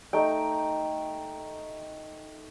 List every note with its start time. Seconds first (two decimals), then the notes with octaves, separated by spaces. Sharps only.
0.13 A3 D#4 G5